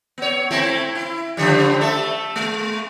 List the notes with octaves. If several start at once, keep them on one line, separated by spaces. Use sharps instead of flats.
B3 C#5
A3 C4 E4
E4
C#3 F3 G3
A3 A4 E5
G#3